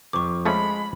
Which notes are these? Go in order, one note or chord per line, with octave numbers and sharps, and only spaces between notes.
F2 F3 C#6 D6
F3 G#3 A3 C#4 B5